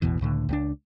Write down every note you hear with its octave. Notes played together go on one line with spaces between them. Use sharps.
A1 E2 B2 E3
C#2 A2 D3
C#2 G#3 D4